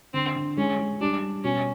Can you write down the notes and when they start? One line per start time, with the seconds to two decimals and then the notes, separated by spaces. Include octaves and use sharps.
0.14 D3 C4
0.36 D3
0.57 G#3 C#4
0.79 G#3
1.00 G3 D4
1.22 G3
1.44 B2 C#4